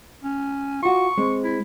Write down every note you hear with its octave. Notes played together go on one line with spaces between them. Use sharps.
C#4
F4 F#4 C#6
G#3 C4
E4